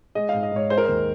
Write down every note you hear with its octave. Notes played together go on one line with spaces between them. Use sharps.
G#3 D#5
G#2 F5
D#5
G#2 C#5
G#3 C5
A#4
D#2 C5